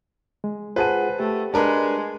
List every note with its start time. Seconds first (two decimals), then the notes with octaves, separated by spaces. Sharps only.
0.44 G#3
0.76 F4 G#4 B4 C5 F#5 A5 D#7
1.19 A3 G4
1.54 G#3 D4 A#4 B4 A5